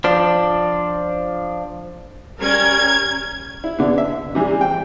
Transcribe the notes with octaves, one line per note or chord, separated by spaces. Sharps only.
F3 D4
G3 C#4 A#4 G#6
E4
D3 B3
E5
C3 E3 G3 G#3
G5